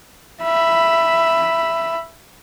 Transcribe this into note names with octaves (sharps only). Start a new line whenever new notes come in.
E5 B5